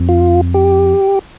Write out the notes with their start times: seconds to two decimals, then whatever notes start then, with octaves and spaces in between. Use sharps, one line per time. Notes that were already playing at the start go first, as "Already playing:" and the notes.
Already playing: F2
0.09 F4
0.54 G4